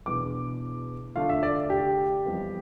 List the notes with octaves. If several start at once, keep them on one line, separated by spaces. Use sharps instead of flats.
E2 B2 B3 D4 D6
D3 A3 D4 F4 F5
E5
D5
G4
F2 E3 G3 B3 F4